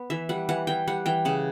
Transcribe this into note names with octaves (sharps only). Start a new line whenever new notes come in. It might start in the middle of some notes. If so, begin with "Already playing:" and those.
Already playing: B3
E3 E5
G3 F#5
E3 F#5
E3 G5
G3 F#5
E3 G5
C#3 F#5